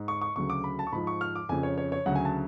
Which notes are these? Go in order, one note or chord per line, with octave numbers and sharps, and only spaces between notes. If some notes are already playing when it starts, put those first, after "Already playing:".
Already playing: G#2
C#6
C#6
D2 C#3 F#3 C#6
D6
B5
A5
C#6
G#2 F3 B5
C#6
F6
D6
F2 C#3 F3 G#5
C#5
C#5
C#5
D2 C#3 F#3 F#5
G#5
A5